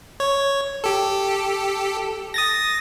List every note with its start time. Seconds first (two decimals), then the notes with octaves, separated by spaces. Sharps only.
0.20 C#5
0.84 G4 A4
2.34 D#6 A6 A#6